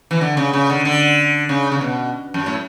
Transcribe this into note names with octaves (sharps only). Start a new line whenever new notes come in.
E3
D3
C#3
C#3
D3
D3
C#3
C#3
B2
F#2
A2